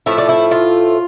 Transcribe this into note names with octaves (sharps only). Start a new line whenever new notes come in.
A2 F3 A3 E4
D4
E4
F4